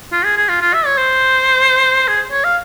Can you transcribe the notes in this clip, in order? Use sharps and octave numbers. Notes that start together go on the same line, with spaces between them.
F4
G#4
G#4
F4
F4
E5
C#5
C5
G#4
C#5
F5